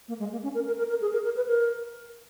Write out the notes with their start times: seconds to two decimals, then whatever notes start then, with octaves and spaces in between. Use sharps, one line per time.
0.08 A#3
0.19 G#3
0.32 A#3
0.43 C#4
0.55 A#4
0.67 A#4
0.78 A#4
0.89 A#4
1.01 G#4
1.13 A#4
1.24 A#4
1.36 B4
1.48 A#4